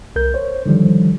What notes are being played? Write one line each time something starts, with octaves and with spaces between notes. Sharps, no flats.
C2 A#4 G6
C5 C#5
D3 D#3 F3 G3